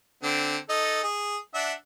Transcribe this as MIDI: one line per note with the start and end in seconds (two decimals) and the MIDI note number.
0.23 0.57 50
0.23 0.57 60
0.69 1.01 63
0.69 1.01 69
1.03 1.37 68
1.54 1.73 62
1.54 1.73 76
1.54 1.73 78